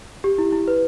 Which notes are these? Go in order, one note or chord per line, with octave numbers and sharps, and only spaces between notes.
G4
E4
E4
B4